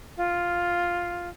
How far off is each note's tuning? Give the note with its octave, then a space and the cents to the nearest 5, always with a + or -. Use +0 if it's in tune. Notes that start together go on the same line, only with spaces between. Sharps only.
F4 +5